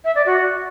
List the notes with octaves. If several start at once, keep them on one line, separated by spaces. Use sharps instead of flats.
E5
D5
F#4